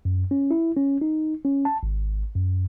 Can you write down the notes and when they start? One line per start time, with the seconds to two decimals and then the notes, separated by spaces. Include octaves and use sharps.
0.05 F#2
0.31 C#4
0.51 E4
0.77 C#4
1.01 D#4
1.45 C#4
1.65 A5
1.83 G#1
2.35 F#2